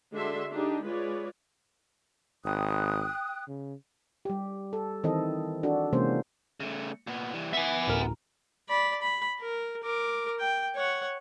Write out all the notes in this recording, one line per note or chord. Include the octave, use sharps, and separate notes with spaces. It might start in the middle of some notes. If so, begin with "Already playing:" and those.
D3 G#3 D4 F#4 E5 C6
D4 D#4 G4
G#3 F4 B4 C#5 D5
G#1 G5 D#6 F#6
C#3
G3 G4
A4
D#3 E3 C4 E4 A4 D#5
D4 F#4 A4
C3 E3 G#3 A#3 C#4 C5
C#3 A3
A#2 B3
E3 G3
B3 E5 G#5
A1 D2 A#4
D5 B5
B5
A#4
A#4 D6
G5
C#5 F#5